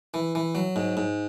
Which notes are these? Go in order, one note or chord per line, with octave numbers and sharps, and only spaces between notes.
E3
E3
F#3
G#2
G#2